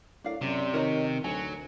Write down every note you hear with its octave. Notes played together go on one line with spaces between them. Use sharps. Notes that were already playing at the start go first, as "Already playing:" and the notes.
A2 D4 A#4 F5
F#2 C3 D5
D#3 A#4 C#5 D#5
D2 F#3 G#5